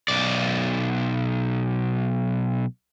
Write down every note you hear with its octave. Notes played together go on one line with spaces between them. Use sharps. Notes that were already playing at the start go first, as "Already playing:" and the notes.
B1 D5